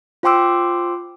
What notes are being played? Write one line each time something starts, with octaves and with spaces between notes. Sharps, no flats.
F4 C5 G5 C6 D6 E6